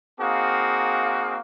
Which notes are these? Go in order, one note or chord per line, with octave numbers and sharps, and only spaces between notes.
A#3 C4 D#4 F#4 G#4 F5